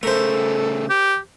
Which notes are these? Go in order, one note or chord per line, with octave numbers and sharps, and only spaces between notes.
C#3 A3 A4 A#4 C5
G4